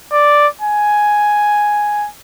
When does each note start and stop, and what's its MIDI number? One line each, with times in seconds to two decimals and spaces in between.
0.12 0.47 74
0.61 2.08 80